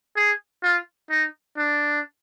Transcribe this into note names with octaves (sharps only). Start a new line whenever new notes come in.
G#4
F4
D#4
D4